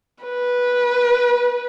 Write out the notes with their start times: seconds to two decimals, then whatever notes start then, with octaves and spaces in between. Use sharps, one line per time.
0.24 B4